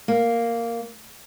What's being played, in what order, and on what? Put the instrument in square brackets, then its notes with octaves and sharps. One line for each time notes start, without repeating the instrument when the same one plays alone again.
[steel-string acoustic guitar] A#3